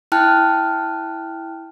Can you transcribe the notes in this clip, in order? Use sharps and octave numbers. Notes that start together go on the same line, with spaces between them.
E4 G5 A5 F6 F#6